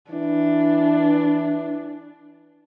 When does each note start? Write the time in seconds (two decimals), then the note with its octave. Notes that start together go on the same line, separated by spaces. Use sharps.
0.11 E3 D4